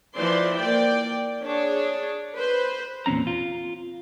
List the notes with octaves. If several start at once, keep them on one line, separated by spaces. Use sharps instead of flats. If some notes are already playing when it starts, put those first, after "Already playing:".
E3 F3 C5 D5 C6
A#3 D5 G5
D4 G#4 C#5 D5
B4 C5
E2 A#2 C4 C#4 A#5
F4